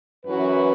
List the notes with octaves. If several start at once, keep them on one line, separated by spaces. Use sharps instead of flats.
F#2 E3 C#4 F#4 B4